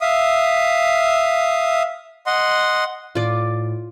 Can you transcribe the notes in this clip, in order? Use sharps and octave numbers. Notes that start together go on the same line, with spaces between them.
E5 F5 D#6
D#5 F#5 C6
A2 F4 D5